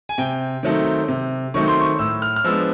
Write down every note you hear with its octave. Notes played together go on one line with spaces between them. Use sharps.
G#5
C3 G5
D#3 F#3 A3 C4
C3
D#3 F#3 A3 C4 C#6
C6
C#6
A2 E6
F6
F6
F3 G#3 B3 D4 E6